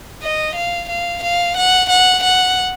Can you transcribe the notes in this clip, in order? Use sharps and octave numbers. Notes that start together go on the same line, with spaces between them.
D#5
F5
F5
F5
F#5
F#5
F#5